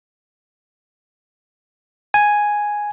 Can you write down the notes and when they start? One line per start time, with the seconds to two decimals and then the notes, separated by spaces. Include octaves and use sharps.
2.14 G#5